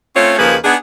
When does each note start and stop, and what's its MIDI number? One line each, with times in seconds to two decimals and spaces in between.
0.15 0.37 57
0.15 0.37 60
0.15 0.37 61
0.15 0.37 65
0.15 0.37 73
0.39 0.55 39
0.39 0.55 49
0.39 0.55 53
0.39 0.55 58
0.39 0.55 68
0.39 0.55 71
0.64 0.75 59
0.64 0.75 62
0.64 0.75 63
0.64 0.75 68